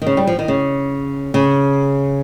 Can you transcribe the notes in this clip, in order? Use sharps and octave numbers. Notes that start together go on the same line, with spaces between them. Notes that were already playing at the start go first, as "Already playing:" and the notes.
D#3
C#3
G3
F3
D#3
C#3
C#3